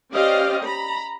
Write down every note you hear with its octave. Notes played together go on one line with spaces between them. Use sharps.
C#4 G4 C5 D5 D#5 F5
A#5 B5